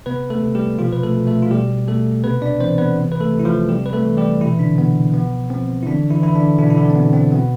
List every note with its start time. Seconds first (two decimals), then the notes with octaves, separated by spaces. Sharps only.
0.06 C3 B3 B4
0.30 A3 A4
0.42 C3
0.55 G3 G4
0.79 B2 F3 F4
0.92 B4
1.03 A3 A4
1.15 B2
1.27 A3 A4
1.42 F4
1.51 B2 G3 G4
1.88 B2 A3 A4
2.24 C3 B3 B4
2.42 D4 D5
2.60 E3 C4 C5
2.78 B3 B4
2.97 C3
3.12 B4
3.20 A3 A4
3.33 C3
3.40 E4
3.45 F3 F4
3.69 C3 G3 G4
3.86 B4
3.93 A3 A4
4.05 E3
4.17 G3 G4
4.41 B2 E3 E4
4.59 D3 D4
4.77 B2 B3
5.14 F3 B3
5.50 F3 C4
5.83 E4
5.86 D3 E3 D4
6.10 E3 E4
6.22 E3 E4
6.35 D3 D4
6.59 B2 D3 D4
6.70 E4
6.77 D3 D4
6.90 C4
6.95 B2 B3
7.13 C4
7.31 B2 B3